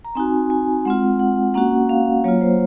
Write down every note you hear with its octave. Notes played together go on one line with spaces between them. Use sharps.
A#5
C4 D#4 F#4 G#5
G#5
G#3 C4 F4 F#5
F#5
A#3 C#4 F#4 F#5
F5
F#3 A#3 F4 C#5
C5